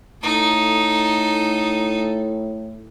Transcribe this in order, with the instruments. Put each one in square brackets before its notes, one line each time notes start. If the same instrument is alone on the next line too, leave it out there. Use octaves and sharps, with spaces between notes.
[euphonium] A2 [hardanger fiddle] D#4 A4